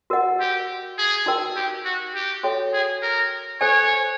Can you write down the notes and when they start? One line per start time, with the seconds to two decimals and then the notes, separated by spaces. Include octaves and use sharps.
0.10 F#4 A#4 D#5 F#5
0.40 G4
0.98 G#4
1.26 D#4 F#4 A#4 D#5 G5
1.56 G4
1.85 F#4
2.15 G4
2.43 F#4 A4 C#5 E5 G5
2.73 G#4
3.02 A#4
3.61 A4 C5 C#5 D#5 G#5